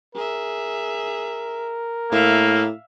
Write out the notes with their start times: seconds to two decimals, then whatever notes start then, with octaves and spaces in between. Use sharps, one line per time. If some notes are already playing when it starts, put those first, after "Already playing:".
0.15 G#4 A#4 E5
2.12 A2 A#3 E5 F5